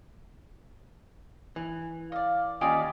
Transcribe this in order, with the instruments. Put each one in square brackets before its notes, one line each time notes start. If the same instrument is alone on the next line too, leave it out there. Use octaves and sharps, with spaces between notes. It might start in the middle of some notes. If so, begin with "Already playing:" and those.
[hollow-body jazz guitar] E3
[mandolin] D5 D#5 [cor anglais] F5
[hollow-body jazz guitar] D#2 F4 G5 [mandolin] C#4 D5 B5 [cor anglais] D#5